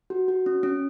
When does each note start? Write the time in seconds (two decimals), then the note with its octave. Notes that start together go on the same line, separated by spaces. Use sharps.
0.10 F#4
0.28 F#4
0.46 C#4
0.63 C#4